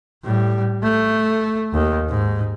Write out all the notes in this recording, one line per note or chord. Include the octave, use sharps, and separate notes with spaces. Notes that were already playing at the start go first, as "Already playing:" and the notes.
A2 G3
A3
D#2
G#2